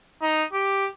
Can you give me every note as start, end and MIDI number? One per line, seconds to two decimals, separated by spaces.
0.22 0.45 63
0.53 0.89 67